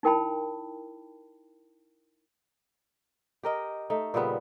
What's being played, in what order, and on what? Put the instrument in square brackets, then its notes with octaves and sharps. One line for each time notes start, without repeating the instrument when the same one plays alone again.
[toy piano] D#4 E4 A#4 G5 A5 B5
[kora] G4 A#4 D#5
A3 D#4
A#2 C#3 G3 B3